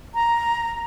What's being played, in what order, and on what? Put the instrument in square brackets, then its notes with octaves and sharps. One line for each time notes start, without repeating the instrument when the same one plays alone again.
[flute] A#5